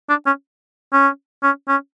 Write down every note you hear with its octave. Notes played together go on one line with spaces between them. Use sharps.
D4
C#4
C#4
C#4
C#4